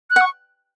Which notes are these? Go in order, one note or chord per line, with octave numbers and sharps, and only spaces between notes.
F#6
F#5
C#6